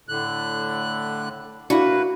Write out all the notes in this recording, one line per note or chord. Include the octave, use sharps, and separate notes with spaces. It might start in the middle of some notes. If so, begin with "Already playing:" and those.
A2 D3 F#6
A#3 D4 E4 F#4 B4